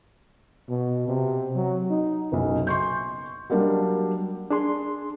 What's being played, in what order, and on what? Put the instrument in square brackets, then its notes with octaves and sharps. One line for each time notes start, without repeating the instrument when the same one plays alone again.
[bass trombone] B2
C3
F#3
D#4
[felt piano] F#1 B1
C6 C#6 G6
F#3 G3 A#3 D4
[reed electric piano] D4 G#4 C6